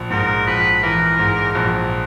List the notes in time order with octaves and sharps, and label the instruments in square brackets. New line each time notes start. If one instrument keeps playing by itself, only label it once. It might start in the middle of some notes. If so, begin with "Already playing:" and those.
Already playing: [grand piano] A#1
[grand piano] G#2 [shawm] A#4
[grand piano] A#1 [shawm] B4
[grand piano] E3 [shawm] A#4
[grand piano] G#2
A#1